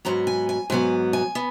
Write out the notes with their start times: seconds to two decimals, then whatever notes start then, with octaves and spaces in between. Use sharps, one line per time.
0.05 G#2 F#3 B3 A#5
0.27 G#5
0.49 G#5
0.70 G#2 F#3 B3 G#5
1.13 G#5
1.35 B3